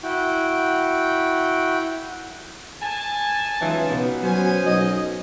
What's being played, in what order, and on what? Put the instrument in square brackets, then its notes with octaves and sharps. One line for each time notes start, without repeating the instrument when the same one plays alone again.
[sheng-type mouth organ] E4 F#4 G5
[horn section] G#5 A5
[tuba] C#2 [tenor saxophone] E3 [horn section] F#3 D#4 F4
[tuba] B2 [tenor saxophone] B3
[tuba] F#3 [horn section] C#4 C5 G#5
[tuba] B1 [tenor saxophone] D#5